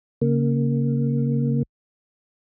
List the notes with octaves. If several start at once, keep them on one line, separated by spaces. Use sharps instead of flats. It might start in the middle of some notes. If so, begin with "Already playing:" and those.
C#3 A#3